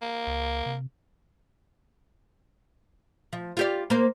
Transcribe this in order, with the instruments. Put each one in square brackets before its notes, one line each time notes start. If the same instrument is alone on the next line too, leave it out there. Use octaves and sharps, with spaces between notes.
[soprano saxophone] A#3
[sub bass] C#2
C3
[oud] F3
F4 G4 D5
A#3 C5